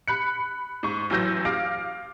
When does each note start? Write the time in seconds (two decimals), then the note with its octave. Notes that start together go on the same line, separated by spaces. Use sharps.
0.08 B5 F#6 C#7
0.83 G#2 C#6
1.10 A1 E3 F#3 E6 G6 A#6
1.45 F5 D6 F6 A#6 D7